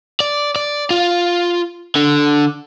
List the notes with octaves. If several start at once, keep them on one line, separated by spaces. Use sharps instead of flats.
D5
D5
F4
D3